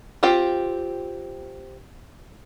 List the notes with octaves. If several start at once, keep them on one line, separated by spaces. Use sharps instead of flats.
C4 F4 G4 G5